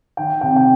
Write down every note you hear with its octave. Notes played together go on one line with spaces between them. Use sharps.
D#3 G5
C3 G5
G5